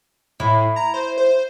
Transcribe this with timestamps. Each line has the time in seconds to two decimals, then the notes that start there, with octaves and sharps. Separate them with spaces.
0.40 A2 E4
0.76 A#5
0.94 C5
1.18 C5